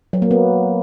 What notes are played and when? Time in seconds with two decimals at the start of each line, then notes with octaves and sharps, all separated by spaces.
0.13 F#3
0.22 A#3
0.31 B3